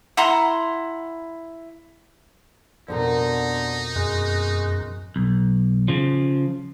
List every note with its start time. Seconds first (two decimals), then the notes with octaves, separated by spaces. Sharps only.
0.17 E4 F#5 A#5 C6
2.88 F2 B2 D3 D#4 A#4
3.96 F#2 G#3
5.16 B1
5.88 C#3 F3